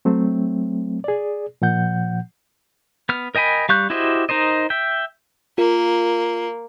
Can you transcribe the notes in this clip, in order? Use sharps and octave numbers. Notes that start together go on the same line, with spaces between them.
F#3 A3 C4
G#4 D5
A#2 F3 F#5 G6
B3 F6
A#4 D#5 G5 G#5 B5
G3 F5 C#6 F#6 G6
E4 F#4 G4 C5 D#5
D#4 A#4 C5 D#5
E5 G5
A#3 F4 A#4